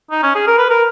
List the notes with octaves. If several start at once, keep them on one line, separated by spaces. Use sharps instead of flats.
D#4
C#4
G#4
A#4
B4
A#4